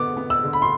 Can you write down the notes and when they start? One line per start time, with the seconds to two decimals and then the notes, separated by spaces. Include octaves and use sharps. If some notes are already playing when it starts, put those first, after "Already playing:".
Already playing: D3 B3 D6
0.17 B3
0.30 E6
0.44 D3
0.53 B5
0.62 C6